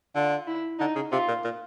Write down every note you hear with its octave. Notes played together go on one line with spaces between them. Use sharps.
D3 F4
E4
D3 D#4
C#3
C3 F4
A#2
A#2